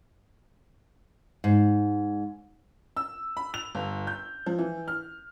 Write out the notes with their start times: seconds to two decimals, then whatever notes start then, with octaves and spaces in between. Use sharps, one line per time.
1.44 G#2
2.97 E6
3.37 B5
3.54 F7
3.75 G1
4.07 G6
4.46 F3
4.58 E3
4.88 F6